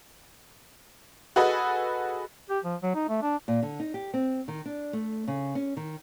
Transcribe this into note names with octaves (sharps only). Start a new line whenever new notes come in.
F#4 G#4 A4 B4 D#5
G4
F3
F#3
D#4
A3
D4
A#2
D3
D#4
G4
C4
D#3
D4
A3
C#3
C#4
D#3